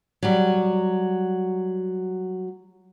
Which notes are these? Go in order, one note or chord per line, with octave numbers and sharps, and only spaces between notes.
F#3 G3